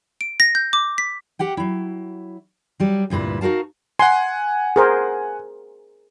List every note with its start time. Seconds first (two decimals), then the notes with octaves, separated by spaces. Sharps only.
0.21 D7
0.40 A#6
0.55 G6
0.73 D6
0.98 B6
1.39 G4 F#5 G5
1.57 F#3 E4
2.80 F#3 G3
3.10 D2 G2 A#2 E4 B4
3.41 D#4 F#4 A#4 F5 A5
3.99 F#5 G#5 C6
4.76 G#4 A#4 C5